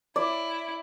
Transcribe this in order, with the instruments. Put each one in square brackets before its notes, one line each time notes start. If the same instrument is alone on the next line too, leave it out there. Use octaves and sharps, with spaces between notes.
[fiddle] E4 [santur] D5